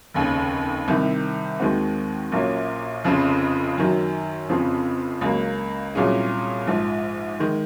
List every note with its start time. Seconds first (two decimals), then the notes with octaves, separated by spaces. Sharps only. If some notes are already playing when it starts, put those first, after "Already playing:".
0.14 F1 D#2 C#3
0.88 C2 C3 D#3
1.60 D#2 D#3 G#3 C4 F#4
2.32 A#1 A#2 F#3 A#3 C#4
3.04 F1 F2 C#3 F3
3.78 F#2 D#3 F#3
4.49 F1 F2 C#3 F3 C4
5.21 C#2 C#3 F#3 A#3
5.95 C2 A#2 F#3 C#4 G#4
6.67 A#1 G#2 F3
7.39 D#3 G#3